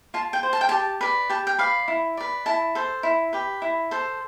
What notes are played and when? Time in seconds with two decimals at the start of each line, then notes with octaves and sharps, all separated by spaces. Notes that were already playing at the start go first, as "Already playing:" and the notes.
0.14 F4 A5
0.33 G5
0.43 C5
0.53 A5
0.61 G5
0.69 G4 A5
1.01 B4 D5
1.29 G4 A5
1.47 G5
1.59 B4 D5 F5
1.88 E4
2.17 B4 D5
2.46 E4 A5
2.75 A4 C5
3.03 E4
3.33 G4 B4
3.62 E4
3.91 A4 C5